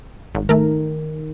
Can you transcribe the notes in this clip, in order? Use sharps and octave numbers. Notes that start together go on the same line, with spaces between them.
G#1
D#3 A3 A#4